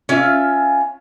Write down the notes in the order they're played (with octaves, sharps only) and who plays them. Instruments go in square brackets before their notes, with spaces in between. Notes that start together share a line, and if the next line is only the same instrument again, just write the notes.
[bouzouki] C#4 F4 E5